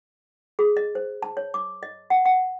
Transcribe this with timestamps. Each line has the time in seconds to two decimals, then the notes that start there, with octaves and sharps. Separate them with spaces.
0.59 G#4
0.77 D#5
0.95 C5
1.23 A5
1.37 C#5
1.54 D6
1.83 D#5
2.10 F#5
2.25 F#5